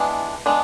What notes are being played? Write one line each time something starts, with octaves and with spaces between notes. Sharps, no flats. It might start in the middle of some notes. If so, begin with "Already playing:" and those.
Already playing: E3 G#3 B3 D4
G#3 B3 D4